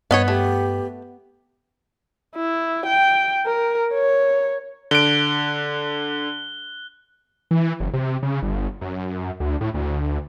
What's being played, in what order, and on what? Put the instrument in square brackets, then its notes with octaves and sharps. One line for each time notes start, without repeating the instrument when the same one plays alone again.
[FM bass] G2 [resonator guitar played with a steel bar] B3 [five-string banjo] C#5 D#5 F5
[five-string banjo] A3 [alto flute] G4
[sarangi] E4
G5
A#4
C#5
[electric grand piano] D3 D7 [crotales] F#6 G7
[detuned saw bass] E3
F#1
C3
C#3
G1
F#2
D2
A2
D2